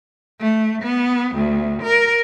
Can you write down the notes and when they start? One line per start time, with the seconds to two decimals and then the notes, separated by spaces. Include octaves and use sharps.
0.40 A3
0.82 B3
1.36 D2
1.83 A#4